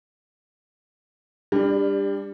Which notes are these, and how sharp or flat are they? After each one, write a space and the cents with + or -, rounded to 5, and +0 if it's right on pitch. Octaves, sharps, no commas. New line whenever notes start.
G3 +25 D4 +0